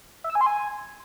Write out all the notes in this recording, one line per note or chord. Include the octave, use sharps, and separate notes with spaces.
E5
E6
G#5
C6
G#5